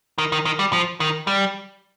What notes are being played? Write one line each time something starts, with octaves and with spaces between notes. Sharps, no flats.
D#3
D#3
D#3
G3
F3
D#3
G3